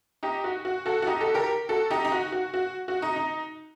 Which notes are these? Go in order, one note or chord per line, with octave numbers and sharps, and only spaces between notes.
D#4 G4
F#4
F#4
F#4 A4
F#4
D#4 G4
F#4 A4
G4 A#4
F#4 A4
D#4 G4
D#4
F#4
F#4
F#4
F#4
D#4
D#4